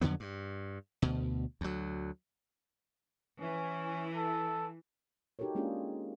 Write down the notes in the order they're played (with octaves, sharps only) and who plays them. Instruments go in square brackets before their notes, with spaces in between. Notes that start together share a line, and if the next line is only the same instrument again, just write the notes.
[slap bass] F2 D3 F#3 B3
G2
D2 B2
D2 F#3
[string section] E3 [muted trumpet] C#4
[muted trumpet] A4
[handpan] D#4 F#4 G4 A4 A#4 C#5
G#3 A#3 C#4 D4 F4 G#4